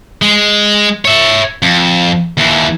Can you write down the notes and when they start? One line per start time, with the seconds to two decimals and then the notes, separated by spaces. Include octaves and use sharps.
0.22 G#3
1.05 C#5 E5
1.63 F2
2.38 D#2 E3